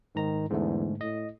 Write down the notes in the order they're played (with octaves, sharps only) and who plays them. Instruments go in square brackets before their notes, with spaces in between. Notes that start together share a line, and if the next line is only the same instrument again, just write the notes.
[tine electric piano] G#2 A#5 [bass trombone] D#3
[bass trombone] E2 [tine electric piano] G#2 D3 A3
[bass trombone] A2 [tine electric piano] D#5